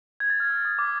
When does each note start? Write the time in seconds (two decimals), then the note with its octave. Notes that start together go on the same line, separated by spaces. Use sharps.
0.20 G#6
0.30 A6
0.40 F6
0.50 E6
0.65 D#6
0.79 D6